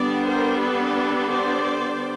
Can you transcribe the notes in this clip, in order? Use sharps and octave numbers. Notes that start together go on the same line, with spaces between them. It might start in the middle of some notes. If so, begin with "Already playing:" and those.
Already playing: D3 G3 B3 D4 D5
A#4 C5
A4 B4
C5 D5